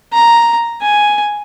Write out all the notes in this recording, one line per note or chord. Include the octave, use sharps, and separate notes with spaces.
A#5
G#5